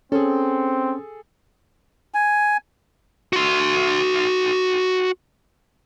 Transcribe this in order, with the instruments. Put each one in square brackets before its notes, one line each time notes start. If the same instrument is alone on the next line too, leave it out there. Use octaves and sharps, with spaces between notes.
[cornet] C4 [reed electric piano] C#4 [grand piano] G#4 A4
[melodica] G#5
[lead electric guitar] F#4 C6